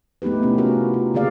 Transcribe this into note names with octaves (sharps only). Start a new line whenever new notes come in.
A3 B3 D#4 G4 B4
C3 A3 C#4 E4
F4 F#4 A#4
F4
C#3 A#3 G4 G#4 D5 F5